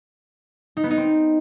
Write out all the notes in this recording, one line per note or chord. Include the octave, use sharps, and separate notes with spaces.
D#4
B3
D#4
C4